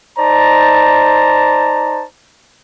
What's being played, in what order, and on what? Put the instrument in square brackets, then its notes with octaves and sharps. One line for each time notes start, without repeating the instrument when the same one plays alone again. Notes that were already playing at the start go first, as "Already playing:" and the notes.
[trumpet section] D#4 C5 D5 A5 A#5